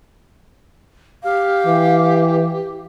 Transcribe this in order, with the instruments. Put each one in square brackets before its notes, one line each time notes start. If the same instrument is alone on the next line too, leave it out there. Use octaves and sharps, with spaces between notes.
[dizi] G4 [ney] F5
[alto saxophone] E3